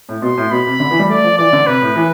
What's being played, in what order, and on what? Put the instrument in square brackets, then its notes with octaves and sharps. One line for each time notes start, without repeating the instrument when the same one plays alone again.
[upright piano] A2
[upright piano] B2 [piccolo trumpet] C6
[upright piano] A2
[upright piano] B2 [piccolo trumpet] B5
[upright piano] C3
D3
E3
G3
[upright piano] A3 [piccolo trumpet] D5
[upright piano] F3
[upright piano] E3 [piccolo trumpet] D5
[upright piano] D3
[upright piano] C3 [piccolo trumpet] B4
[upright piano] A2
E3